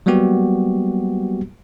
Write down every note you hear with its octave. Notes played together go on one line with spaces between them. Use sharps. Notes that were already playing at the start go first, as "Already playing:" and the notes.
F#3 G3 A#3 B3 F#4 G4